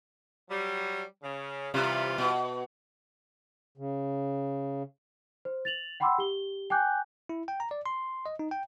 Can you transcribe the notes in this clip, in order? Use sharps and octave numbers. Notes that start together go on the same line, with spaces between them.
F#3 G3
C#3
C3 E3 G3 F4
B2
C#3
C5
A6 F7 F#7
F#5 G5 B5 C6 D6 E6
G4 G7
G5 G#5 D6 F#6 G6
E4
G5
A#5
D5
C6
D#5
D#4
G5